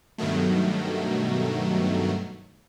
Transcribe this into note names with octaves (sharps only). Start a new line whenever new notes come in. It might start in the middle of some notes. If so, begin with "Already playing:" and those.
G2 B2 D#3 F#3 A3